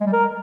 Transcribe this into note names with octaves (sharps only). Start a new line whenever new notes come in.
G#3
G3
A#4